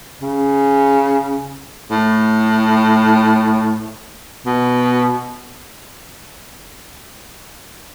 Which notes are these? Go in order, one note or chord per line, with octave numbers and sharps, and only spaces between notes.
C#3
A2
B2